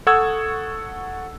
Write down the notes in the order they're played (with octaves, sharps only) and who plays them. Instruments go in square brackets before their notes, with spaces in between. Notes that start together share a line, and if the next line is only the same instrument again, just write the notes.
[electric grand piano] A4 F#5 C#6 D#6 E6 G#6